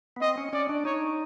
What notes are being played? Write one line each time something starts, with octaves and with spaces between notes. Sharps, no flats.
B3
C4 D#5
C#4
C#4 D5
D4
D#4 C#5